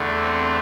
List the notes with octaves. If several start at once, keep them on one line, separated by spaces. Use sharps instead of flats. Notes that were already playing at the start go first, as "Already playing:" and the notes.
Already playing: E2 D3 A3
C4